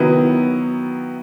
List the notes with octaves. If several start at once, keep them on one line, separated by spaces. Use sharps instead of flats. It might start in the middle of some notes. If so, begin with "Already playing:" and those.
Already playing: D#3 F#3 B3 E4